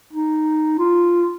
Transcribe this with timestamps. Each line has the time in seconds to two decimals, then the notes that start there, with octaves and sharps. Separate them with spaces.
0.13 D#4
0.79 F4